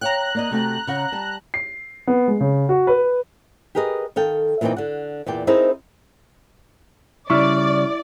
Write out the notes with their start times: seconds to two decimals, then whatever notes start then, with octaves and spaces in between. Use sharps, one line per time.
0.01 C#5 F5 G5 A#5 F#6
0.35 A#3 D5 D#5
0.51 C3 A3 F#4
0.87 C#3 F#5
1.12 G3 A5
1.54 C7
2.07 B3
2.28 G#3
2.40 C#3
2.69 F#4
2.87 B4
3.75 G4 G#4 A#4 B4 D#5
4.16 D#3 A4 F5 G5
4.61 A#2 E3 A#3 C4 D#4 G5
4.76 D3 F#5
5.26 E2 A#2 D5 G5
5.47 C4 D#4 E4 G#4 A#4 B4
7.30 C#3 G3 E4 D5 C#6 F6